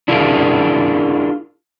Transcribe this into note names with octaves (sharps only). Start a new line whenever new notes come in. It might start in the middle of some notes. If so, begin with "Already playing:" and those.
D4 E4 F4 G#4 A#4